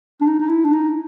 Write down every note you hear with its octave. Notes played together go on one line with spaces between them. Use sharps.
D4
D#4
D#4
E4
D4
D#4